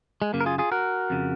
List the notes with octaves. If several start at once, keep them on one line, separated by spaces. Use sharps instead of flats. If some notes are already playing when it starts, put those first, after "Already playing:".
G#3
F#2 C#3 A#3
A#4
F4 G#4
F4 G#4
F#4 A#4
F2 C#3